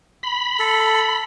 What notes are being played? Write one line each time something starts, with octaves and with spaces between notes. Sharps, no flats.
B5
A4